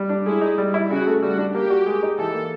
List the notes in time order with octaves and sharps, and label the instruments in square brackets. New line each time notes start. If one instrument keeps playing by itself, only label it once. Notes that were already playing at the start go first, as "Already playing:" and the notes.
Already playing: [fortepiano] G3
D4
[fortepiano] G#3 [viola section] E4
[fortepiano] D#4
G3
E4
[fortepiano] C#3 [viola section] F#4
[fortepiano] A3
[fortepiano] G3 [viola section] F#4
[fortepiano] D4
[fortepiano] A#3 [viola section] G4
[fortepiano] F#4
G#3
D#4
[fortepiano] E3 [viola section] A4
[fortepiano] A#3